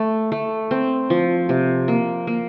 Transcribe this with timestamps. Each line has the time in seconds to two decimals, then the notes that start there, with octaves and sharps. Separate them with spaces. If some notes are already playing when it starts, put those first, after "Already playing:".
Already playing: A3
0.32 A3
0.71 C4
1.10 F3
1.49 C3
1.88 A#3
2.27 A#3